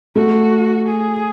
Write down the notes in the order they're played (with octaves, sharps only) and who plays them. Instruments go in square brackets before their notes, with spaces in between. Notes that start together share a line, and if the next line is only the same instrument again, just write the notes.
[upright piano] A3 [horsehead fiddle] F#4
[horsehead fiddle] G#4